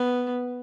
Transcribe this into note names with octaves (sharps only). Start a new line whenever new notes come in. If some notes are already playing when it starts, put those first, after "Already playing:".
Already playing: B3